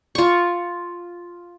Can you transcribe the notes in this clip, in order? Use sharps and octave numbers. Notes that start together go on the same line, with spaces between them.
F4 C#6